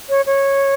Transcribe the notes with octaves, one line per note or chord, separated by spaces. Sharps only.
C#5
C#5